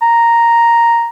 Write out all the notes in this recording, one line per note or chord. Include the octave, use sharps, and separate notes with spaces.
A#5